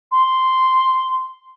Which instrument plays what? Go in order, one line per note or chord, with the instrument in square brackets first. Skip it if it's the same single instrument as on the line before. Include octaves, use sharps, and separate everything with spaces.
[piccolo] C6